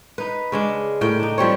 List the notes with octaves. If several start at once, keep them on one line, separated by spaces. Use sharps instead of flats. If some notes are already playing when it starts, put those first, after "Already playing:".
D#4 B4
C#3 G#3 D4
A2 A#4 G5
D4 D#4
F3 G3 C4 C#5